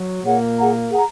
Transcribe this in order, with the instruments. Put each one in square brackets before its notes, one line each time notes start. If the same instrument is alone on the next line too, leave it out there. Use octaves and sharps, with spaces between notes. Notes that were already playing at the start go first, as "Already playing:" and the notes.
Already playing: [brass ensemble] F#3
[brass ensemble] A#2 A#3 [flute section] G#4 C#5 F#5
[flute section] G#4 F#5 A#5
G#4 F#5 A#5